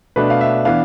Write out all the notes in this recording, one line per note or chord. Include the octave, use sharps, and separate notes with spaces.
B2 A3 D4 B4
F5
E5
E3 B3 D4 F5